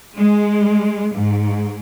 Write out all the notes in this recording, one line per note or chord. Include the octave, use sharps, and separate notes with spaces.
G#3
G#2